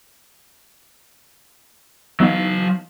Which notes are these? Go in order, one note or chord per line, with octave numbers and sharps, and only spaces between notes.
E3 F#3 B3 D#4 F5